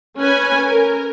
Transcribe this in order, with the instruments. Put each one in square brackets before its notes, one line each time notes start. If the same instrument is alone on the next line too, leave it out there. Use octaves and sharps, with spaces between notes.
[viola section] C#4 B4 G#5
A#4